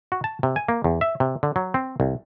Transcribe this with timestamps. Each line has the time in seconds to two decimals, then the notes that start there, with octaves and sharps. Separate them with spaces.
0.12 F#4
0.24 A5
0.43 C3
0.56 G#5
0.68 A#3
0.84 E2
1.01 E5
1.20 C3
1.43 D3
1.56 F#3
1.74 C4
2.00 C2